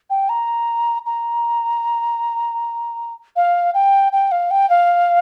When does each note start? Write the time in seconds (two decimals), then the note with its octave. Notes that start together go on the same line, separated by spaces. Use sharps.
0.10 G5
0.29 A#5
1.06 A#5
3.36 F5
3.74 G5
4.12 G5
4.32 F5
4.51 G5
4.70 F5